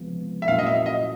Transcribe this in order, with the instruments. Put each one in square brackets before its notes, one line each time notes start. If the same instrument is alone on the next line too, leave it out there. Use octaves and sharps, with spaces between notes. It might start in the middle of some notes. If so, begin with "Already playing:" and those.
Already playing: [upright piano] C#2 C3 F3 G#3 B3
[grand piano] E5
[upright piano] A#2 F#3 A#3 C#4 E4 [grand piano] F5
[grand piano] D#5
E5
D#5